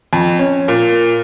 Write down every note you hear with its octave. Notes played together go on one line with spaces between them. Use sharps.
F2
C#4
A#2